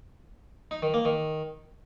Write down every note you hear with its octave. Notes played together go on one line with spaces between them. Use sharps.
D#4
D#3
A#3
D#3